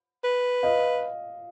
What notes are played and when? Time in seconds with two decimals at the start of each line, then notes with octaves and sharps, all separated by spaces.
0.24 B4
0.63 D#5 F5